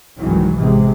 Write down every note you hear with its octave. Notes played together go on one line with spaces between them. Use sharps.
F1 C2 G#2 D#3 E3 F#3
A1 C3 G#3